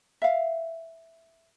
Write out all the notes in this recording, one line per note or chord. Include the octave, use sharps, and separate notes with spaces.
E5 F5